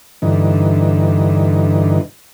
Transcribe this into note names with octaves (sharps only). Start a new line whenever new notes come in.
G2 D3 E3 D#4